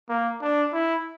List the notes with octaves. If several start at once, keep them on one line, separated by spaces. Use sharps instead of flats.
A#3
D4
E4